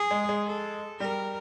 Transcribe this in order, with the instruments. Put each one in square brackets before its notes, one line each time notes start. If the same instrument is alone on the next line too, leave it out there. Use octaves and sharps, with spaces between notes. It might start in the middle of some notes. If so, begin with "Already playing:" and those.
Already playing: [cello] G#4
[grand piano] G#3
G#3
[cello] A4
[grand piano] G3 [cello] A#4